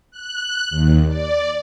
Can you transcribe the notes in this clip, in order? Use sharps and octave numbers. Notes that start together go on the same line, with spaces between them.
F#6
D#2
D5